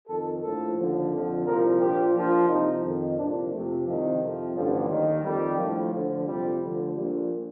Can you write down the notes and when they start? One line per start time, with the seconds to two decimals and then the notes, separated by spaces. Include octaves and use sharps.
0.08 F2 D#3 A4
0.42 A#1 A2 F3 A4
0.77 D#2 D3 F3
1.11 F2 D3 F3
1.46 C2 A#2 F3 A#4
1.80 A#1 A#2 F3 G4
2.15 A#1 A#2 F3
2.49 C2 C3 F3 D#4
2.84 F2 D#3
3.18 C2 A#2 F3 D4
3.51 F2 C3 F3 A3
3.86 C2 C3 D#3 F3
4.21 F2 C3 F3
4.55 A1 G2 D3 F3 G3
4.90 D#2 D#3
5.23 F2 D#3 G3
5.58 A#1 A2 F3
5.92 D2 D3 F3
6.26 F2 C3 F3 G3
6.62 D2 D3 F3
6.96 A#1 A#2 F3 G3